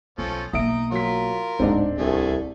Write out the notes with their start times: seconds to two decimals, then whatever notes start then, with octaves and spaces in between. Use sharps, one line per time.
0.18 B1 F3 C#4 A4
0.53 B1 A#3 E5 A#5 D#6 D7
0.92 F#3 F4 A#4 B6
1.60 D1 G#2 B3 C4 D4
1.99 C2 A3 G#4